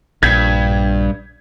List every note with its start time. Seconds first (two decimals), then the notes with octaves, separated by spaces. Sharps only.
0.23 A#1 G2 G6 G#6 B6